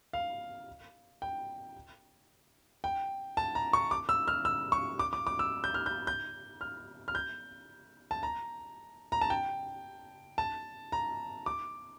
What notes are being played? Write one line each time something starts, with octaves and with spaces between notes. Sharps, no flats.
F5
G5
G5
A5
A#5
C#6
D6
E6
F6
E6
C#6
D6
D6
D6
E6
G6
F6
G6
G6
F6
F6
G6
A5
A#5
A#5
A5
G5
A5
A#5
D6